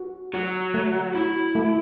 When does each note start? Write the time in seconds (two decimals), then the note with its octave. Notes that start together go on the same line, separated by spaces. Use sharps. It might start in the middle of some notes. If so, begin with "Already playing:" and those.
Already playing: F#4
0.34 F#3 F#4
0.74 A3
1.15 E4 F#4
1.55 A3